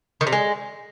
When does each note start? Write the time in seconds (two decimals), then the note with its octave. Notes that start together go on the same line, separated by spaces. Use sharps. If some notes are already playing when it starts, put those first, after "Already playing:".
0.21 D#3
0.27 C3
0.32 G#3